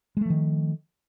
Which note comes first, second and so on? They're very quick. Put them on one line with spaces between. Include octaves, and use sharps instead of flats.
G#3 A3 F3 D#3